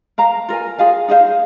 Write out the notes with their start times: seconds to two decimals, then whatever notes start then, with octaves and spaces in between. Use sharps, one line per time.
0.18 A#4 F5 A#5
0.49 F4 A#4 G#5
0.79 F4 G#4 F5 G#5
1.08 D#4 G#4 C5 F5